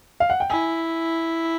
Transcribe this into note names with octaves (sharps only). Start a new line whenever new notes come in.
F5
F#5
G5
E4 G#5